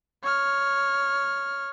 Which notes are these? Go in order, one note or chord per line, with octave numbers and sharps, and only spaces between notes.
C#5 F6